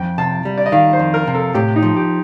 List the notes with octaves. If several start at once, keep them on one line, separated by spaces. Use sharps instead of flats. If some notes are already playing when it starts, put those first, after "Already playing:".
Already playing: F2 G5
C3 A5
G3
D5
D#5
D#3 F5
C5
F2
A#4
C3
A4
A2 G4
D#4
F3
G4